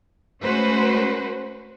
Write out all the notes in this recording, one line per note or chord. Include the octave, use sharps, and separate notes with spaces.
G#3 A3 C#4 F#4 B4 C5